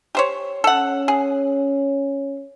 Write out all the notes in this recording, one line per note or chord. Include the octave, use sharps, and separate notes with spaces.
G4 C5 C#5
C#4 A4 F#5
G#4